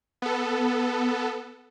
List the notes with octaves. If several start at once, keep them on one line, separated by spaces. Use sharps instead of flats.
B3 A4